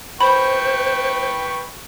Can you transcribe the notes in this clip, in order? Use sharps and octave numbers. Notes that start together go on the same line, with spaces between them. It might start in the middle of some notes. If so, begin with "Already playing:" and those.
B4 C5 G5 B5 C#6